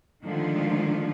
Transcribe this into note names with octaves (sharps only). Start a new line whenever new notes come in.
D3 D#3 F3 G#3 A3 F4